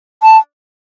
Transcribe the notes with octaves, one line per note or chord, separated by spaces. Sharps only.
A5